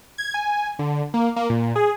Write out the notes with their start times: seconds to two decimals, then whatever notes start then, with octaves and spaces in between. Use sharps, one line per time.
0.18 G#6
0.34 G#5
0.79 D3
1.14 A#3
1.36 A#3
1.50 A#2
1.76 G#4